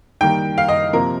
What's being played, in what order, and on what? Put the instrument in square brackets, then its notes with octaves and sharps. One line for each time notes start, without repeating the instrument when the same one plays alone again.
[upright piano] D#3 G3 A#3 G5
F5
D#5
C3 F3 A#3 A#4